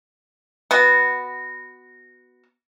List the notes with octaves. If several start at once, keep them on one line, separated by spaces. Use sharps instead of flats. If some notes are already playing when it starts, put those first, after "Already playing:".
B3 F#4